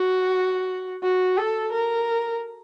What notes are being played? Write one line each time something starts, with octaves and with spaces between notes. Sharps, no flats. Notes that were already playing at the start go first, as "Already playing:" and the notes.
Already playing: F#4
F#4
A4
A#4